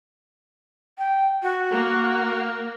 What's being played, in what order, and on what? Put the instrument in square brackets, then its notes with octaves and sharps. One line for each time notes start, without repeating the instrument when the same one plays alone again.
[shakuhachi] G5
F#4
[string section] A#3